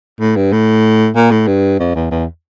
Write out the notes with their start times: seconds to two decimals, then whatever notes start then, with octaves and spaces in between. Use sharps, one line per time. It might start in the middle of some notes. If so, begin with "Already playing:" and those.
0.21 A2
0.36 G2
0.52 A2
1.16 A#2
1.31 A2
1.47 G2
1.80 F2
1.95 E2
2.11 E2